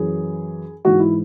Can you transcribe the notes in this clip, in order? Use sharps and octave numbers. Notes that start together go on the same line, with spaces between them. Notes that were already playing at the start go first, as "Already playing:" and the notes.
Already playing: F#2 E3 G#4
G#2 E3 F#4
E4